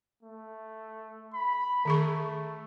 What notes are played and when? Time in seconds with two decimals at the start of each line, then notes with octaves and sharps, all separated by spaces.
0.23 A3
1.34 B5
1.85 D#3 A3 G#4 C#6